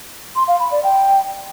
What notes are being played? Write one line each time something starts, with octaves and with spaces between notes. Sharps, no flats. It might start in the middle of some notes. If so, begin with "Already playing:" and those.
C6
F5
B5
D5
G5